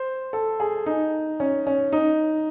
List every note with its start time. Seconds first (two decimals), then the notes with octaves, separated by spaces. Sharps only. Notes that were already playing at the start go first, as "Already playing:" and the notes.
Already playing: C5
0.33 A4
0.60 G#4
0.86 D#4
1.40 C#4
1.67 C#4
1.93 D#4